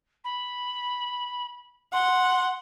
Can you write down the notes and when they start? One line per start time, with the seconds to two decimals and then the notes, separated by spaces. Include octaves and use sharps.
0.24 B5
1.93 F#5 C6